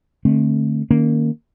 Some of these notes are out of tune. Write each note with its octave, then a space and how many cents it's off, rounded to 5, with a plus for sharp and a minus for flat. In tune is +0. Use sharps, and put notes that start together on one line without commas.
D3 +15 A3 +0 C4 +20
D#3 -15 A#3 -10 C#4 +0